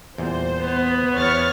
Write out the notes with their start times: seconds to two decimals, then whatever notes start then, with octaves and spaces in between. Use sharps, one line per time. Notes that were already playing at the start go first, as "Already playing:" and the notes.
0.18 E2 A#2 G3 C5
0.61 B3
1.17 E2 C#5 C#6 F6 A6